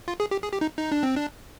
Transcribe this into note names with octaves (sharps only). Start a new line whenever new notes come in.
F4
G#4
G4
G#4
G4
D#4
D#4
D4
C4
D4